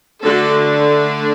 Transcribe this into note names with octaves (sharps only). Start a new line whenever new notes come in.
D3 A3 D4 F#4 A4